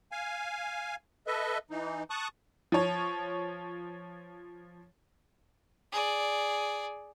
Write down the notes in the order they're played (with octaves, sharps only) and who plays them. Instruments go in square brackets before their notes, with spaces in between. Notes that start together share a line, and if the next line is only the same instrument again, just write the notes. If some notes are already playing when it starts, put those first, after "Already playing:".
[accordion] F5 G#5
A4 B4 D#5 E5
E3 D#4
A5 C#6 D#6 F#6
[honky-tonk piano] F3 C#5
[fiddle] G#4 D5